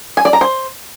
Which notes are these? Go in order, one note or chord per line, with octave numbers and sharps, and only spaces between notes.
G#5
D5
A#5
C5